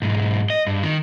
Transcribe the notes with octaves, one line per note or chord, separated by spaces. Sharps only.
B1 G#2
D#5
G2
D#3